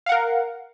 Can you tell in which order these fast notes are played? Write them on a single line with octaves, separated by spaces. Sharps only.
F5 F#5 A#4